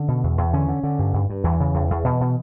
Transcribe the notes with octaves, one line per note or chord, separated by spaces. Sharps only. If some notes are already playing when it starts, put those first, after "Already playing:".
Already playing: D3 C#4
B2
E2
E2
D3 C#4
D3
D3
G2
G2
G2
E2 E3
C#3
E2
E2
B2
B2